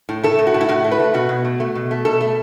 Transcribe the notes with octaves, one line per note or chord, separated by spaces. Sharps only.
A2
A3 A4
A2
F#4
A2
E4
A2 F#4
A3
B4
A3
B2 F#4
B2
A3
A3
B2
A3
B2 A4
A3